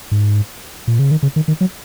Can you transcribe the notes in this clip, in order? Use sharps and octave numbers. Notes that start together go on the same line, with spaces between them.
G#2
A#2
C#3
D#3
C#3
D#3
D#3
F#3